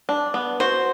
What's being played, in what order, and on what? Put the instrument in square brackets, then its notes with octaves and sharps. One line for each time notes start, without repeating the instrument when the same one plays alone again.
[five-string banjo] D4
B3
[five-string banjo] F#4 [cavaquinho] C5